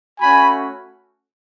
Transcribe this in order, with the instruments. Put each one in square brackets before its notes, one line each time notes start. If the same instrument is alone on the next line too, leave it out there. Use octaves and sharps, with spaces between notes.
[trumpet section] A3 C#4 F#4 G#5 B5